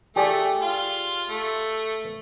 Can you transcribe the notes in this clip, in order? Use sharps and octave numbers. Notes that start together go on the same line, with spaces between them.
A3 G4 G#4 D5
F4
A3